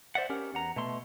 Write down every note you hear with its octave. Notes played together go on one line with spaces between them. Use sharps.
C5 D5 E5 F#5
C#4 G4 A#4
E2 F#5 A#5
B2 A3 C6